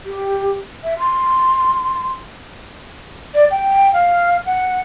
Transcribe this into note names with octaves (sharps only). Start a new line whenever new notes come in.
G4
E5
C6
D5
G5
F5
F#5